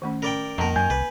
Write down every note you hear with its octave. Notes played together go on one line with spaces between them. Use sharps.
D#3 A3 C#4
C#4 A#4 D5 G5
F2 D#3 A#3 A#4 A5 A#5
F#2 G#5 G6
C2 B4